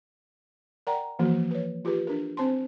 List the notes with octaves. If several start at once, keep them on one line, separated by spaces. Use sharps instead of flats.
A#4 D5 F#5 G5 A#5
E3 F3 A#3 F#4
B4 C#5
F4 G4 G#4 B4
D4 A#4
C4 C5 A5 C6